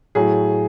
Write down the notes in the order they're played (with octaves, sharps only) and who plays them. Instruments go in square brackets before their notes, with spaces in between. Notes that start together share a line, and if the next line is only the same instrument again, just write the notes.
[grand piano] A2 F#3 G#4